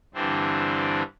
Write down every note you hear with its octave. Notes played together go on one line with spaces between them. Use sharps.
G2 D3 E3 C4 D4